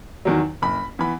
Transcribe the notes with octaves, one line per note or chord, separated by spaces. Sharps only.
E2 D#3 F#3
F#1 B5
E3 B3 B5